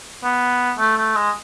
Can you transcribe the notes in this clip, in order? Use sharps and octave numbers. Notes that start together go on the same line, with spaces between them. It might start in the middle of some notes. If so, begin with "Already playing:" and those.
B3
A3
A3
G#3